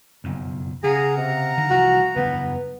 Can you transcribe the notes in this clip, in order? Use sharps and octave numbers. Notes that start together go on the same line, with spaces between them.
F#1 B1 F2
C#3 G#4 F5 F#5 A#5
C3
D3 D#3
C2 E3 F3 F#4
F#1 E2 G2 B3